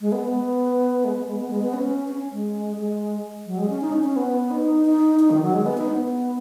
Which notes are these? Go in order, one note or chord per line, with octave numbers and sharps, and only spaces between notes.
G#3
B3
B3
G#3
B3
G#3
B3
G#3
B3
C#4
C#4
G#3
G#3
F#3
G#3
C#4
D#4
C#4
C#4
B3
D#4
D#4
D#4
D#3
F#3
G#3
B3
D#4
B3